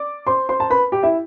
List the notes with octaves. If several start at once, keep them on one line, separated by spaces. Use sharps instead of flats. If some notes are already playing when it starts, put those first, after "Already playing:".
Already playing: D5 D6
C5 C6
C5 C6
A5
B4 B5
G4 G5
E4 E5